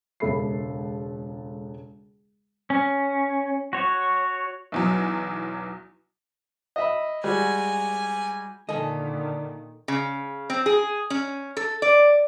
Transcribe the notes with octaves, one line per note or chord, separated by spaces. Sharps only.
E1 C#2 A4 E5 B5 C7
C#4
F#4 C#5
B1 E2 F#3
D#5 E5 B5
G3 G#3 F#4 G#5
A#2 D3 D#3 A4 D#5 G#5
C#3
C4
G#4
C#4
A4
D5